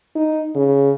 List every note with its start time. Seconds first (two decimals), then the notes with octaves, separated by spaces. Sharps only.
0.15 D#4
0.55 C#3